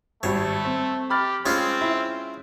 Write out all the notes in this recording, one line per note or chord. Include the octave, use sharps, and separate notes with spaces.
G#1 G3 A3 C#5
C4
G4 B5 F6 A6
G#3 C4 C#4 F4
E4